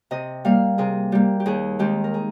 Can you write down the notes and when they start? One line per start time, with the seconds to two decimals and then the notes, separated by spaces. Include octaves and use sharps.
0.11 C3 D#5
0.45 G3 A#3 F5
0.78 C3 G#4
1.12 G3 A#3 G4
1.40 G4
1.46 D#2 G#4
1.79 D#3 G#3 C4 G4
2.04 A#4
2.14 G#4